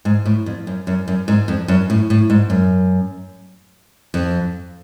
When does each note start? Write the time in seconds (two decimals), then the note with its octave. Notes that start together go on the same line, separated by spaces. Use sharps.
0.05 G#2
0.26 A2
0.46 F2
0.67 F#2
0.87 F#2
1.08 F#2
1.28 G#2
1.48 F2
1.68 F#2
1.90 A2
2.10 A2
2.30 G#2
2.50 F#2
4.14 F2